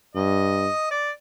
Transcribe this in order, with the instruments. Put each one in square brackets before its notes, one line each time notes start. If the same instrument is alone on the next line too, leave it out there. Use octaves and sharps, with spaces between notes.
[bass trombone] G2 [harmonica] D#5
[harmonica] D5